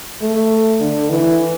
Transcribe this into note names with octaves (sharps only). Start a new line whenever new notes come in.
A3
D3
E3